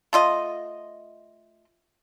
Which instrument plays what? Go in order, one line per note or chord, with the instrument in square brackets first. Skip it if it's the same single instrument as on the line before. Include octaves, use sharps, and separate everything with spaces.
[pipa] A3 F4 D#5